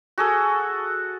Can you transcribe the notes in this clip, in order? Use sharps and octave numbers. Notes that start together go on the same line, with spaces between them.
F#4 G#4 A4